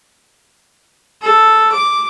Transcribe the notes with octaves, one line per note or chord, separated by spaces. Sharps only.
A4
D6